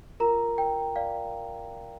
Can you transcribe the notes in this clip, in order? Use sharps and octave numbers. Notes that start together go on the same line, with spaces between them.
F4 A#4 A#5
A#4 G5
D5 F5